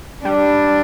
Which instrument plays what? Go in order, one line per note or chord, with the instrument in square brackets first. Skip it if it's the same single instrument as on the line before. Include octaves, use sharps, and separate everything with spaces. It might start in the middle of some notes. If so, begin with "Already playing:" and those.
[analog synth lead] G3 [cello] D4